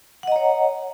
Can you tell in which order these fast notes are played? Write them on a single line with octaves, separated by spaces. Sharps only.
F#5 D#5 A#5 C#5